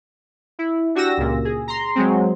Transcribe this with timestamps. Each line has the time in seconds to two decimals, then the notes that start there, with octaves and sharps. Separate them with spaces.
0.59 E4
0.95 D4 F#4 G4 E6 A#6
1.17 C#2 A#2
1.45 G#4
1.68 A#5 C6
1.96 F#3 G#3 C4